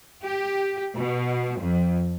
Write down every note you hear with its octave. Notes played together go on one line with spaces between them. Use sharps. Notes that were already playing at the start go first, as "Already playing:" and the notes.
G4
B2
F2